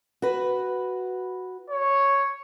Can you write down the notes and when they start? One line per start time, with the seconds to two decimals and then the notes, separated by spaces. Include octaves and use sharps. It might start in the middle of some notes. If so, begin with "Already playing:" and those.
0.22 F#4 B4
1.70 C#5